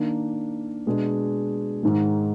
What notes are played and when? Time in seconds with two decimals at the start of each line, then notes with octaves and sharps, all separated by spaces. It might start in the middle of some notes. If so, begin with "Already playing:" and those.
Already playing: D#3 A#3 D4
0.86 B2 G#3 D4 G#4
1.83 G#2 D#3 G#3